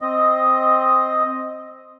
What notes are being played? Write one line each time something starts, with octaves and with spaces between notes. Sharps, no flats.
C4 D#5